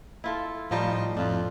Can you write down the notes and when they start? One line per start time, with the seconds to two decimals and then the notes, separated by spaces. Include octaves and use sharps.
0.24 E4 F4 A4
0.71 A2 F3 G3 D#4 F4
1.17 F2 D4 F4